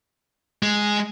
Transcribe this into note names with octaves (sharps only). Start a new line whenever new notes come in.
G#3